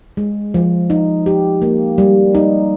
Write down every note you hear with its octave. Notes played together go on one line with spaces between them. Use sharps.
G#3
F3
D#4
G4
A#3
G3
D#4